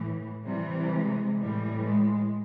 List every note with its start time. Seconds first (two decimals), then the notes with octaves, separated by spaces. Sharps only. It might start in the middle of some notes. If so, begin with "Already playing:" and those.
Already playing: A2 E3
0.45 C3 E3 G3
0.92 G#3
1.38 A2 E3 G3
1.85 G#3